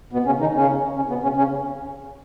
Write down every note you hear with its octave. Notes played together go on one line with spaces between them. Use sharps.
B2 B3
C#3 C#4
D#3 D#4
C#3 C#4
C#3 C#4
B2 B3
C#3 C#4
C#3 C#4